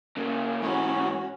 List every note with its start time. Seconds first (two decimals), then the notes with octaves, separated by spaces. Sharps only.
0.17 C#3 A#3
0.62 G#2 E3 C#4 F#4